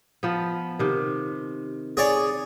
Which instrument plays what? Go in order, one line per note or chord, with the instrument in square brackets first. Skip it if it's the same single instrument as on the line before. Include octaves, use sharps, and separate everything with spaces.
[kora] F3 B3
C3 D#3
[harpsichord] G#4 C#5 D5